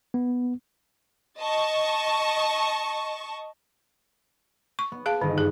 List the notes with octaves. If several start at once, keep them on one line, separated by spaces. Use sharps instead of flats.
B3
D#5 A5 C#6
C#6
B3
G#4 F5 A5
G1 D3 D#3 D#5
G2 G#4